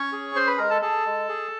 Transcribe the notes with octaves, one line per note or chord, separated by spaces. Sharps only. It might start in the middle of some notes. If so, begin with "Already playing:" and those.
Already playing: C#4 C#5 C#6
G#4
C#4 C5 C6
B4 B5
G#3 A#4 A#5
A4 A5
G#4 A4 A5
G#3
G#4